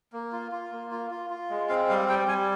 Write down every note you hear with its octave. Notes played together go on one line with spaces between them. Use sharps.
A#3
F4
F4
A#3
F4
F4
F4
G#3
C4 F5
G3 F5
G3 G5
G3 G#5